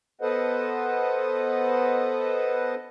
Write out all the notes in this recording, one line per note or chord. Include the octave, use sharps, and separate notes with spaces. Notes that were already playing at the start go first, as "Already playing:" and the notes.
B3 A4 B4 C5 D#5 F#5